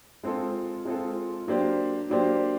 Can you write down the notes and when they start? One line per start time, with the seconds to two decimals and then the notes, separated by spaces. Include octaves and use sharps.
0.23 G#3 C4 F4 A4
0.85 G#3 C4 F4 A4
1.47 F#3 A#3 D4 G4 C5
2.09 F#3 A#3 D4 G4 C5